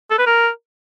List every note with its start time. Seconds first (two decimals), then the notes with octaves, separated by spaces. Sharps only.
0.11 A4
0.19 B4
0.27 A#4